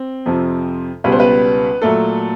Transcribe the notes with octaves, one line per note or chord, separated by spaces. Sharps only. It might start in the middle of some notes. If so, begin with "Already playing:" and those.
Already playing: C4
F2 C3 F3
C#2 B2 G3 B4
C5
B3 B4
A#2 F#3 A3 A4